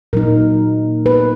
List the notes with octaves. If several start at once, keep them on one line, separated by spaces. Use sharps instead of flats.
A#2 F#3 A#3 D#4 A#4
B4